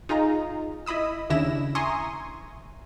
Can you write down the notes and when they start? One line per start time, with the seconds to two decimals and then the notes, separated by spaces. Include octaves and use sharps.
0.09 D#4 F4 G#4 D#5 A#5
0.86 E4 D#5 B5 D#6 E6
1.30 D#2 C#3 D4 E4 A#6 E7
1.75 E5 G#5 A#5 C6 C#6 D#6